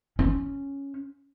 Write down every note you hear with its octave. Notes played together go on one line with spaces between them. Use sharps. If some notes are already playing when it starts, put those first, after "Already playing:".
C#4